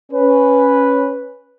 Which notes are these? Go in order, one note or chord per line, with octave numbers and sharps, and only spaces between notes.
C#4 B4